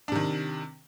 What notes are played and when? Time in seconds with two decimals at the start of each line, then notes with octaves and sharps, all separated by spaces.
0.08 D4
0.12 C3
0.15 D#3